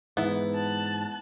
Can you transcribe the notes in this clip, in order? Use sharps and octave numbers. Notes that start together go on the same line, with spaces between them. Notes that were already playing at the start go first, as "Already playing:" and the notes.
G#2 E3 B3 E4
A5 F#6